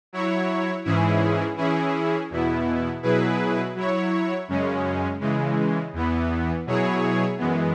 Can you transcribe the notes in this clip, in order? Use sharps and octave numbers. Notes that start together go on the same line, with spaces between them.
F#3 E4 C#5
G#2 E3 C#4 E4 G#4
E3 C#4 E4 G#4
E2 B2 B3 E4
B2 F#3 E4 G#4 B4
F#3 E4 C#5
F#2 C#3 G#3 C#4
C#3 E3 G#3
E2 E3 B3
B2 F#3 E4 G#4 C#5
F#2 E3 G#3 B3